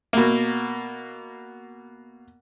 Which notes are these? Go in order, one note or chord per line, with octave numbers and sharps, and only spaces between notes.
B2 A#3